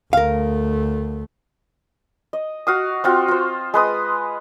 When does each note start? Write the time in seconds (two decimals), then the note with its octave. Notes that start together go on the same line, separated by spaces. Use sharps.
0.13 D2 A3 A#4 F5
2.33 D#5
2.67 F#4 F5 D#6
3.04 C4 F4 F#4
3.28 F4 C5
3.74 G#3 B4 D#6